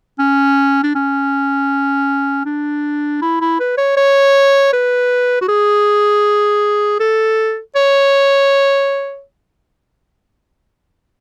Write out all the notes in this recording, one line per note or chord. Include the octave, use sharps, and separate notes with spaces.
C#4
D4
C#4
D4
E4
E4
B4
C#5
C#5
B4
F#4
G#4
A4
C#5